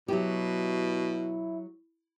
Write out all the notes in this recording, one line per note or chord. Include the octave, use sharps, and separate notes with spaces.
B2 F#3 E4 G4